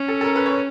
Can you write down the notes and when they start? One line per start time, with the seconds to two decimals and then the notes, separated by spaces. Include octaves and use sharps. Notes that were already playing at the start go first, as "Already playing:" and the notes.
Already playing: C#4
0.08 A4
0.21 A4
0.24 A#4
0.36 B4
0.46 C#5